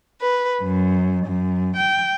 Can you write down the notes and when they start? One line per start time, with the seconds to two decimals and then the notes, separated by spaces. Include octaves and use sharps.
0.20 B4
0.62 F#2
1.24 F#2
1.75 G5